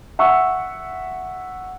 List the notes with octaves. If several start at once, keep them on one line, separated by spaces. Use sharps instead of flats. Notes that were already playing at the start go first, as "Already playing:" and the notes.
E5 F#5 C#6 E6